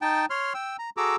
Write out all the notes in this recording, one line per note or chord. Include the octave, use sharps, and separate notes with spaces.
D#4 G5 A5
C#5 C6 F6
G5 E6
A#5
F#4 G#4 A4 A#5 D6 E6